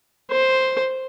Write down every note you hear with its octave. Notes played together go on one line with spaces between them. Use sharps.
C5